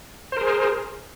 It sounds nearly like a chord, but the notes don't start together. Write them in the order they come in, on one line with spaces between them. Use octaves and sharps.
C5 A#4 G#4